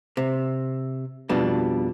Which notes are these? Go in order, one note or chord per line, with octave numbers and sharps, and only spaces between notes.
C3
F2 B2 G3 D4